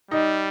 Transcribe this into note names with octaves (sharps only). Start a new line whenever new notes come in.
G3 D#4 D#5